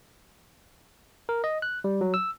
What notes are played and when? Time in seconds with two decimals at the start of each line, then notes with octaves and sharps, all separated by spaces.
1.29 A#4
1.44 D#5
1.62 F#6
1.84 G3
2.01 F#3
2.14 E6